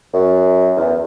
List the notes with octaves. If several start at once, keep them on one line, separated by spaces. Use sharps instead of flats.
F#2
E2